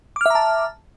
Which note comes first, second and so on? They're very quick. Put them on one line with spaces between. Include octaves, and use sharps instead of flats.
D6 F6 E5 A#5 A5